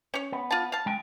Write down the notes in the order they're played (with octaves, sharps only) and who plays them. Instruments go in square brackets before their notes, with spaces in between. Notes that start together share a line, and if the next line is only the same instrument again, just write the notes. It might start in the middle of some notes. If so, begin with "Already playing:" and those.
[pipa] C#4 C#5
[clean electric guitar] B3
[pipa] F4 A5
F5 A5
[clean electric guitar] G#3 G5 G#5